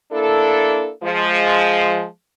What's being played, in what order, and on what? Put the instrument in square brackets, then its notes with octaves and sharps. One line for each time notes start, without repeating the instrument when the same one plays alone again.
[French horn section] A#3 D4 E4 A4
F3 G#3